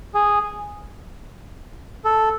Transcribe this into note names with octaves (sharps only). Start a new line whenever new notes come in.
G#4
A4